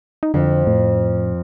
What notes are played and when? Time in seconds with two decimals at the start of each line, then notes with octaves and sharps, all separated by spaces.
0.23 D#4
0.34 F2 D3
0.67 A2